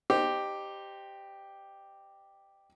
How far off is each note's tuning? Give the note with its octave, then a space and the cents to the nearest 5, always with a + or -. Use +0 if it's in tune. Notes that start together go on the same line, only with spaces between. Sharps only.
D#4 -25 G4 +0 C5 +0